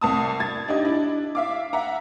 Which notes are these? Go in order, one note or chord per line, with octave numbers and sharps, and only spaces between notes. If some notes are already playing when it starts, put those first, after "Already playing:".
C2 A5 D#6
G#6 A6
D4 D#4 G4 D#5
D4 E4
E5 F5 D6
E5 F#5 A#5